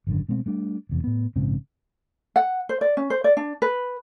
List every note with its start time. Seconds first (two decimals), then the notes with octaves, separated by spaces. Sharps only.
0.07 G#1 F#2 D3
0.28 B2 G#3 A3 C4
0.46 G3 A3 D4
0.89 F1 E2 C3
1.04 A2 B3
1.36 A#1 G#2 C#3 C4
2.36 F#5
2.69 C5
2.81 D5
2.97 C#4
3.10 C5
3.24 D5
3.37 D4
3.62 B4